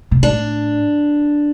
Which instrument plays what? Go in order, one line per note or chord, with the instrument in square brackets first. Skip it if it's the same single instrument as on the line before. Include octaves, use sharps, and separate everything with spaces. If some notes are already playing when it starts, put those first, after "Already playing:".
[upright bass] B2
[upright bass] A2 [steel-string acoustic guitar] D4